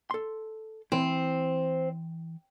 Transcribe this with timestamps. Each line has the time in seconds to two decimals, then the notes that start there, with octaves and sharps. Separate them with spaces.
0.11 A4 C6
0.92 E3 C4 E4